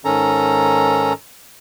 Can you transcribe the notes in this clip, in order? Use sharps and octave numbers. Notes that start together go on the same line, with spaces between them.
G#2 D#3 C#4 A4 A#5